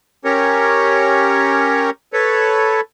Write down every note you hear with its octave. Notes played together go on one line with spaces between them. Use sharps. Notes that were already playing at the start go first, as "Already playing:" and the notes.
C#4 G4 A#4 C#5
A4 B4 C#5